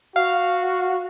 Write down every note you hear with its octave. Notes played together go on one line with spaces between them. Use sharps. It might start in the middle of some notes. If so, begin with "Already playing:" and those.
F#4 F5